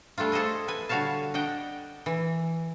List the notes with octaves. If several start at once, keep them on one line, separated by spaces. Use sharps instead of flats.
G3 A3 D4 F4
G#4 A4 C5 D#5 G#5
B4 G#5
D3 G3 F#4 C#5 F5 A5
D4 D#5 F#5 G5
E3